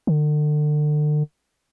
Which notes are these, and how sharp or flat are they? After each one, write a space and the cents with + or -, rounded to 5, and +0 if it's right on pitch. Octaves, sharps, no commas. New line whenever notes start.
D3 +35